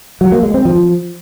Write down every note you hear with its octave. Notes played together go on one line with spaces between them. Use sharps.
F#3
A#3
G#3
C4
F3